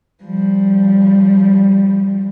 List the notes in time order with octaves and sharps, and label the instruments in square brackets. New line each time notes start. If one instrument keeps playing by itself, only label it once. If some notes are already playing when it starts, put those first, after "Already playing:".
[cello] F3 G3